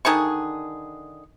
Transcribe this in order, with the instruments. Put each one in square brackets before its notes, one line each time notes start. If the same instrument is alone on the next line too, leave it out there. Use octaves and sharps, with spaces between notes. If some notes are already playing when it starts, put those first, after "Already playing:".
[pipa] D3 D#3 G#4 C#6